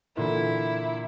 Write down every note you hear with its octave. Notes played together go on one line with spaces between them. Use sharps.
A#2 D3 E3 E4